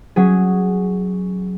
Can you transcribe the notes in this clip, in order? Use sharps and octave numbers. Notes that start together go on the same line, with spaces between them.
F#3 C#4 G#4